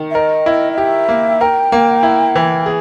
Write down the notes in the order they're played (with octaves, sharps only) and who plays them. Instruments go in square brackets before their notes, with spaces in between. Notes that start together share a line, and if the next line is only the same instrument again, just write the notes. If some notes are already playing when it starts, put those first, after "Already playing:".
Already playing: [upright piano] D#3
[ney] E5
[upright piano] A#4 [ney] D#5
[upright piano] E4
[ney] D#5
[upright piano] G4 [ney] E5
[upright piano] A#3
[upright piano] A#4 [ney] G5
[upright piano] A#3
E4
E3
G#4